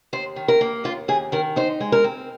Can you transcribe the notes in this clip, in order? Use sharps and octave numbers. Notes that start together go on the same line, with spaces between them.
D#2 C5
D#3
A#4
A#3
D#2 F4
D#2 G#4
D#3 A#4
D#4 C5
G#3
A#4
C4